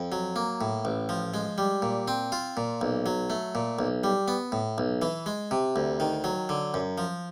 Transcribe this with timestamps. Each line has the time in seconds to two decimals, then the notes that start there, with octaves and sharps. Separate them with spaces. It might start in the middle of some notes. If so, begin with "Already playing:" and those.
Already playing: F2
0.12 F#3
0.36 A#3
0.61 A2
0.85 A1
1.09 F3
1.34 G#3
1.58 G3
1.82 A#2
2.08 C4
2.32 F4
2.57 A#2
2.81 B1
3.06 F#3
3.30 A3
3.55 A#2
3.79 B1
4.04 G3
4.28 B3
4.52 A2
4.78 B1
5.02 E3
5.26 G#3
5.51 C3
5.76 D2
6.00 D#3
6.24 F#3
6.49 D3
6.74 F#2
6.98 F3